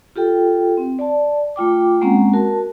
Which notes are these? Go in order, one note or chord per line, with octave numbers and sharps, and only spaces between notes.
F4 G4 A4 G5
C4
D5 A5
A3 F4 G5 D6
G#3 A#3 C4 C#4 F#5 A#5
F#4 A#4 A5